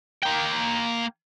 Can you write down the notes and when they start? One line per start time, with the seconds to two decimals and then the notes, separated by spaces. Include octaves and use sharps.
0.23 A#3 G5